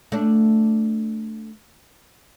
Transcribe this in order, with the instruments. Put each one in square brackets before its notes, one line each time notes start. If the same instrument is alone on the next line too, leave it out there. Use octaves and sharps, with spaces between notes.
[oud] A3 D4